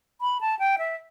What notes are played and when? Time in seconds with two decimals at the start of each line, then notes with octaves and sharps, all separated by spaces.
0.21 B5
0.41 A5
0.59 G5
0.78 E5